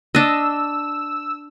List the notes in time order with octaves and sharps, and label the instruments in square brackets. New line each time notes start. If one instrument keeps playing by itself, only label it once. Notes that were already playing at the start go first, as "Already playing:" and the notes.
[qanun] D4 D#5 [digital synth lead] E6